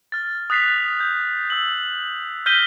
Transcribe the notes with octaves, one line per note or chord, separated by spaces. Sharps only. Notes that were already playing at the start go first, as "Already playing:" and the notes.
F6 A6
D#6 F#6 A6 B6 C7 F7
G6
E6 F#7
F6 G6 A#6 B6 D#7 G7